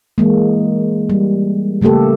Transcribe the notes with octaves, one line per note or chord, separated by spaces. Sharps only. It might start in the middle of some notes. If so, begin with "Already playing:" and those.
E3 G#3 A#3
G3
C#3 A3 A#3 G4 A4